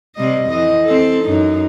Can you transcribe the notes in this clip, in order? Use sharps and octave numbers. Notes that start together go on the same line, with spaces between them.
C3 G3 D#5
F2 E3 D#5
C4 A4
F#2 D#4